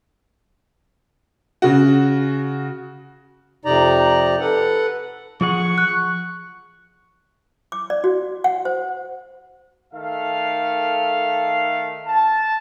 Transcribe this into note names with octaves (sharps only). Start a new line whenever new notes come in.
C#3 F#4
F2 C3 D#4 D5 A#5
A4 B4 F#5
F3 G#4 F#5 C#6
F#6
D6
D5
F#4
F#5
C5
D#3 A3 A4 F5
A5